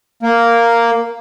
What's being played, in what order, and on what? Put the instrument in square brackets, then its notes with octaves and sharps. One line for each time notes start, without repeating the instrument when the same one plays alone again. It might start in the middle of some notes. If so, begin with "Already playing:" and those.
[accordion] A#3